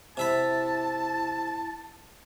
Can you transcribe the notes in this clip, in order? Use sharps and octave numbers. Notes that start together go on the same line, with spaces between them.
C3 E4 E5 A5 B5